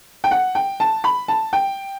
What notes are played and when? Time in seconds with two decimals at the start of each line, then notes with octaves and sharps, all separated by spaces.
0.24 G5
0.31 F#5
0.55 G5
0.80 A5
1.04 B5
1.28 A5
1.53 G5